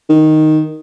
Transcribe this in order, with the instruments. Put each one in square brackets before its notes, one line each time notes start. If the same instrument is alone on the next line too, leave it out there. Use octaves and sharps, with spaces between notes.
[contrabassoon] D#3